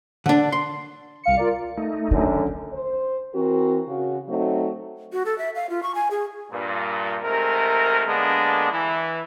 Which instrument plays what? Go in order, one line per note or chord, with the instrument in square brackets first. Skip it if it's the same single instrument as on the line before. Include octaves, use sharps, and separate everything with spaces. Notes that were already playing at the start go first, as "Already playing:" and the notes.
[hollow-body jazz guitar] D3 D4
C6
[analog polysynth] C2 F5 C#7
F4 A#4 D5
[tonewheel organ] A3 D#4
[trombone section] F#2 D3 [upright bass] D#3
[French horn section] C5
E3 C4 F#4 A#4
C#3 F#4
F#3 A3 C4 D#4
[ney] F#4
A4
E5
F5
F4
C#6
G#5
G#4
[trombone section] G2 A#2
G#2 C3 A3 A#4
D3 G#3 A#3 B3 D4
E3